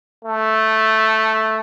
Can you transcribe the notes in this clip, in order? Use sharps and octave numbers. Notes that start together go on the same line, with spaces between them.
A3